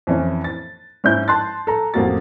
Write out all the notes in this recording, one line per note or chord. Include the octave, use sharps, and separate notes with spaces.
F2 E3 C#4
A6
G#2 C#4 E4 G6
A5 C6 F#6 A6
A4 A#5
A1 F2 A3 A#3 F#4 A6